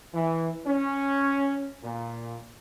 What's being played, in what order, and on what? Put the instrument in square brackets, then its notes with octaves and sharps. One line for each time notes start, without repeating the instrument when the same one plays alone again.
[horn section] E3
C#4
A#2